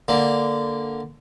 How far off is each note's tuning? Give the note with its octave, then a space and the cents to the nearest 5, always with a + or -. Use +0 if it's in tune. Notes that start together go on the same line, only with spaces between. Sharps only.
D3 +0 A#3 +0